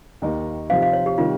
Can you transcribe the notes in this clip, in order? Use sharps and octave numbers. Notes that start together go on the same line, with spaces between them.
D#2 D#3 A#3 D#4
C3 F3 C4 D#4 F5
F5
C#5
G4
C3 D#3 G3 F4